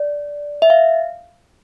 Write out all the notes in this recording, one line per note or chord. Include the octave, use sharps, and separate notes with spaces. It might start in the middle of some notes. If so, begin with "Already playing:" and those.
Already playing: D5
E5
F5